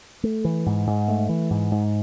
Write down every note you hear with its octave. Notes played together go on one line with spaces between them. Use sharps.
A3
E3
G#2
G#2
A3
E3
G#2
G#2